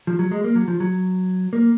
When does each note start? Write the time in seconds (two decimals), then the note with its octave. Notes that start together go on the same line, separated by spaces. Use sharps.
0.07 F3
0.19 F#3
0.31 G#3
0.44 A#3
0.55 F#3
0.68 F3
0.80 F#3
1.53 A#3